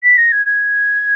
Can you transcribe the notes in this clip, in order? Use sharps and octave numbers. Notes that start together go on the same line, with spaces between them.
B6
A#6
G#6
G#6